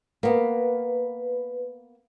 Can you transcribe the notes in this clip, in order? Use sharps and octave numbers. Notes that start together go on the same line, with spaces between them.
A#3 B3 B4